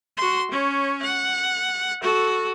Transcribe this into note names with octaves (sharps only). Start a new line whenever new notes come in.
F#4 C6
C#4 C#5
F#5
F#4 A4